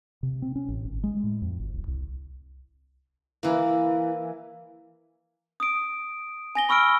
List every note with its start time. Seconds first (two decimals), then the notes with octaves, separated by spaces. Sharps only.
0.23 C3
0.42 C4
0.56 C#4
0.69 A1
0.85 G#1
1.03 G#3
1.24 A2
1.42 F2
1.60 G#1
1.74 D1
1.88 C2
3.43 E3 A#3 E4
5.60 D#6 D7
6.55 G#5 A#6 G7
6.69 B5 C#6 E6 F6 D7